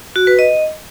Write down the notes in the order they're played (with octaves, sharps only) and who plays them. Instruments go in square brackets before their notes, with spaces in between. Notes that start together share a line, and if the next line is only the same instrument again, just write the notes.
[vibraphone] F#4
B4
D#5